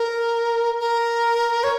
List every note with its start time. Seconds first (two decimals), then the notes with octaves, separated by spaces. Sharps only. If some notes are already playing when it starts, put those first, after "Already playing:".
Already playing: A#4
0.80 A#4
1.64 C#5